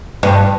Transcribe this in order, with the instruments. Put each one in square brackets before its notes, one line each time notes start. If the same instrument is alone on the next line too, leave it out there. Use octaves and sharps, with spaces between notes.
[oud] G2